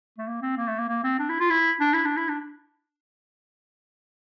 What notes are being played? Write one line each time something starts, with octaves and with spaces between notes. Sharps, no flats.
A3
A#3
C4
A#3
A3
A#3
A#3
C4
D4
E4
F4
E4
D4
E4
D4
E4
D4